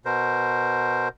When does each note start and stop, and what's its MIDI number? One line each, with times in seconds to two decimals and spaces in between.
0.05 1.08 47
0.05 1.08 70
0.05 1.08 72